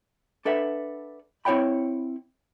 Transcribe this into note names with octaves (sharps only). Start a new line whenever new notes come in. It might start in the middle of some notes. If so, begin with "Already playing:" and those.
D4 A4 B4 E5 F#5
C4 E4 C#5 F#5 G5 B5